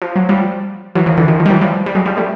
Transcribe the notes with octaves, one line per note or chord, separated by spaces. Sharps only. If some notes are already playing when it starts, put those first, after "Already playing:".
F3
F#3
F3 G3
E3 F#3
D#3 F3
D3 E3
D#3 F3
D#3 F3
G3
E3 F#3
F3 G3
G3
F#3 G#3
F3 G3
G3 A3